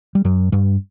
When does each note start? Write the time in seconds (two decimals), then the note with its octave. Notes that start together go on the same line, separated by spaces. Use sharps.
0.15 G3
0.25 F#2 F#3
0.52 G2 G3